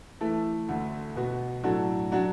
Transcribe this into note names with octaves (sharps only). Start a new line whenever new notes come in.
E3 A3 E4 A4
D2 D3 A3
B2 B3 F#4
A2 F#3 D4 F#4 A4
F#3 D4 F#4